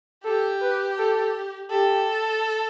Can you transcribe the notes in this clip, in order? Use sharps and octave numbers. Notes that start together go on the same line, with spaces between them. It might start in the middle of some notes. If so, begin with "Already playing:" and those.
G4 A4
B4
A4
G4 A4